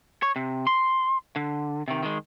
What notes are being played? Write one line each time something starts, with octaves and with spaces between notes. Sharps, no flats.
C#5
C3
C6
D3
C3 D#3
D#3 G#3